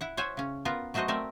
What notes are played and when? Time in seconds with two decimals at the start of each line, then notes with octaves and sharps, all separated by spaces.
0.01 E4 F#5
0.17 C5 C#5 E5 F#5 G#5
0.37 C#3 C#4
0.65 B3 F4 A#4 B4
0.94 F#3 A3 B3 F#4 C5 D#5
1.08 A3 C4 A#4 D5 E5